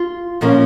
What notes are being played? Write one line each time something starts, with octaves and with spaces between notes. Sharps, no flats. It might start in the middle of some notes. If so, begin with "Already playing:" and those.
Already playing: F4
A#2 F3 A#3 C#4